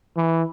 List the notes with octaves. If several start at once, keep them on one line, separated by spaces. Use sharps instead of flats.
E3